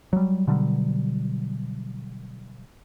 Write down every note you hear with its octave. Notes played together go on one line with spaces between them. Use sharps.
F#3 G3
B2 D3 F#3 G3